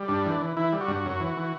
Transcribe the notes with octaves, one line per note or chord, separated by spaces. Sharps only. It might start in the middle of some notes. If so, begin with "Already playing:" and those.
Already playing: G3
G2 D4
E3
E3
E3 E4
G3
F#4
G2
F#2
E3
E3